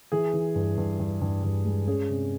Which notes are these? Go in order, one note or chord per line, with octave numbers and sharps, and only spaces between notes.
E3 G#4
E3
G2
G2
G2
G2
G2
G#3
C#4 G#4
C3